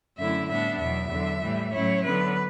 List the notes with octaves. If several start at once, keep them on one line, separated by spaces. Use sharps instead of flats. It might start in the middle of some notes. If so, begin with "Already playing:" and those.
F#2 D3 A3 C#4 E4 E5
A2 G3 B3 D4 E5
E2 B2 F#3 E5
E2 D3 F#3
A2 E3 G3
A2 F#3 C#4 E4 C#5
D3 F#3 B3 B4